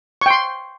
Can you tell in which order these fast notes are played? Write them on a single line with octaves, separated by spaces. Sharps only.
C#6 G5 C6